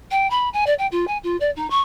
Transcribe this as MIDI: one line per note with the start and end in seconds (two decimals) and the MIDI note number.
0.11 0.29 79
0.30 0.49 83
0.53 0.64 80
0.66 0.74 74
0.78 0.86 79
0.91 1.07 65
1.07 1.17 80
1.23 1.36 65
1.40 1.50 74
1.56 1.68 63
1.70 1.81 85